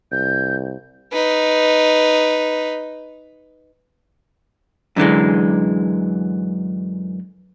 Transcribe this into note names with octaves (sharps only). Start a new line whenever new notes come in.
C2 G6
D#4 B4
F#2 D3 E3 G#3